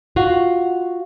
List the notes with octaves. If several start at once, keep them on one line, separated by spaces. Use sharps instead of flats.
F4 F#4